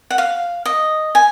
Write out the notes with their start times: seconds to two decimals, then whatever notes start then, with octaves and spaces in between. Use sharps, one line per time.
0.11 F#5
0.18 F5
0.66 D#5
1.15 G#5